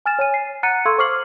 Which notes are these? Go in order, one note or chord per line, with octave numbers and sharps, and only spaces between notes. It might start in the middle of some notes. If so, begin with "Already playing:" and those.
G#5 F6 A6 E7
C#5 G#5 D#7
C7
F#5 A#5 F#6 A6 C#7 D#7
A4 F5 C6 C#6 E6 G#6
C5 C#6 D6 F6 C7 F#7